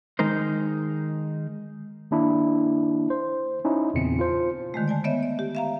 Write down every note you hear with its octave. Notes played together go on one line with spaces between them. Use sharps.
D#3 G#3 D#4 A#4 C5
D#3 A#3 D4 E4
C5
C#4 D#4 E4
E2 A#2 C#3 C4 C#7
F4 C5
D3 D#3 G#3 A3
D5 G#5 A5
B3 C#5 D#5 E5
D5
G4
E5 F5 A#5